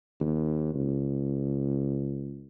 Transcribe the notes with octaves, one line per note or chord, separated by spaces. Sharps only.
D#2
C#2